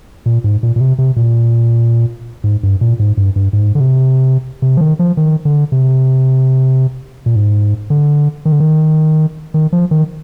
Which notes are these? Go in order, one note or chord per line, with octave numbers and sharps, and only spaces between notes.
A#2
G#2
A#2
A#2
C3
C3
A#2
G#2
G2
A#2
G#2
G2
G2
G#2
D3
C3
C3
F3
D#3
F3
D#3
D3
C3
A#2
G#2
D3
D#3
D3
D#3
D#3
F3
D#3